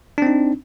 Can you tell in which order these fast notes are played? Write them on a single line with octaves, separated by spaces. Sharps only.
D4 C4 D#4